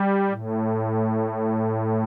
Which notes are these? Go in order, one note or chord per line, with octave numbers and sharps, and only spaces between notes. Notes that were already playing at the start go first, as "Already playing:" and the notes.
Already playing: G3
A2